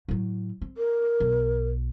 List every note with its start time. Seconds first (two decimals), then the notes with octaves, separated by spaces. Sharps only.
0.08 A2 F#3
0.61 C4
0.77 A#4
1.20 B1